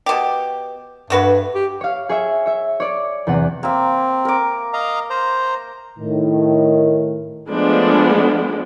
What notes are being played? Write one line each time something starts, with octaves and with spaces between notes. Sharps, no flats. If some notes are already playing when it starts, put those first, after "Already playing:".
B2 G4
G2 A3 F#4 B4
G4
C#5 F5
G#4 C#5 E5
C#5 E5
C#5 D5
E2 C3 B3 F#5
A#3 C4 E5
A#4 D6
D#5 F5 A#5
C5 A#5
A2 D#3
F3 G#3 A3 B3 D4